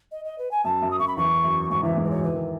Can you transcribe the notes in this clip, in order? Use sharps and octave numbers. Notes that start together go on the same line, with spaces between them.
D#5
D#5
B4
G#5
F#2 A5
F#2
D#6
F#2 C#6
B5
E2 C#6
F#2
G#1 G#2 C#6
E2 E3 E5
G#2 G#3
B4
F#3 C#5
E3 B4
D#3